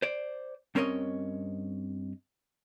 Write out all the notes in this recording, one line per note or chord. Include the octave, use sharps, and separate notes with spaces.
C5 D5
G2 C4 C#4 A#4 C#5 D#5